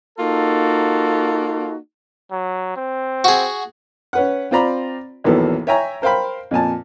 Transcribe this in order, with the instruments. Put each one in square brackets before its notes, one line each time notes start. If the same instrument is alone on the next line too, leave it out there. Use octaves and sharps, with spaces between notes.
[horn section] A#3 D#4 F4 F#4 A4
[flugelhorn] F#3
C4
[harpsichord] F#4 G#4
[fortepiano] C#4 B4 F#5
C4 F4 C5 D5 A#5 B5
A#1 E2 D#3 F#3 B3 A4
C#5 E5 G5 G#5 A#5
A#4 C5 F5 G5 B5
F2 A#2 G#5 A5